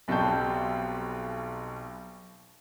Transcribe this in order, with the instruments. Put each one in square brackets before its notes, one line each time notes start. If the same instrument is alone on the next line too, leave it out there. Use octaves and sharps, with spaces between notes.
[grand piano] B1 B2 G3 C4 A5 G6